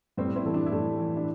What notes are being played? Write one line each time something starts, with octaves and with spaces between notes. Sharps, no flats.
A2 G3 C4
C4 E4
E3 A4
D4 G4
E4
A2 A3 D4
E3
D4